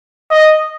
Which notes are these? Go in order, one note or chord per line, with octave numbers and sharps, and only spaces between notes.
D#5